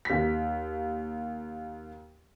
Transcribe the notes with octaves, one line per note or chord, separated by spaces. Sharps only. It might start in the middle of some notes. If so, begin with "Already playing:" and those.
D#2 B6